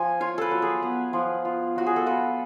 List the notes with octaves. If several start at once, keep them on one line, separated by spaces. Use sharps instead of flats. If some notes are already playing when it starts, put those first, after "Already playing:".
Already playing: F3 G#5
F4 C#5
A4 B4
F#3
G#4
B3
F3
F4
F#3 F#4
G#4
A4
F4 B4